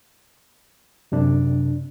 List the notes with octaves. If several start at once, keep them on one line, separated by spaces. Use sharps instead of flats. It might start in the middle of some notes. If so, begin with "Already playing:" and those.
F#2 C3 D4